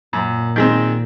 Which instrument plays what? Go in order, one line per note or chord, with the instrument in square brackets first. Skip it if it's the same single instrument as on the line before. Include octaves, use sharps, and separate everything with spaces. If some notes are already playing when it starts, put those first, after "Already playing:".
[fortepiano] F#2 [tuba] A#2
[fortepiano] D#3 G#3 C4